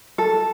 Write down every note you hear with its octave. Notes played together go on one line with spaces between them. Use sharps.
A4